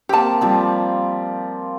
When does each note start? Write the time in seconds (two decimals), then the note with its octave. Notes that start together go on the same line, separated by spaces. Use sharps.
0.09 A#3 C4 G4 A5
0.41 F3 G3 C4